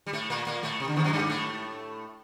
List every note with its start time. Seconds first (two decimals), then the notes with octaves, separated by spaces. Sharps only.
0.07 G3
0.13 A2 A3
0.30 A#2 A#3
0.47 A#2 A#3
0.63 A2 A3
0.80 C3
0.88 D3
0.96 D#2 D#3
1.04 F#2 F#3
1.13 G2 G3
1.29 A2 A3